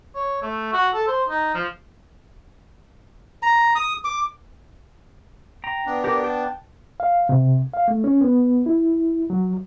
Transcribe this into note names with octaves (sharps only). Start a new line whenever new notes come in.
C#5
A3
F#4
A4
C5
D#4
F3
A#5
D#6
D6
G5 A#5
B3 D4
G4 A#4 D5
G5 A5
F5
C3
F5
A3
C#4
B3
E4
F#3